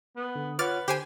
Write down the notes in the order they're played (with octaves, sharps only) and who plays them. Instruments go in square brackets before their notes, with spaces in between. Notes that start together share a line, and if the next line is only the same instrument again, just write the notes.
[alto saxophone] B3
[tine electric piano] D3
[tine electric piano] F4 C#5 F#5 [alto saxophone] B4 [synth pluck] D6 F6 A6
[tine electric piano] D3 [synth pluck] G4 C5 G#5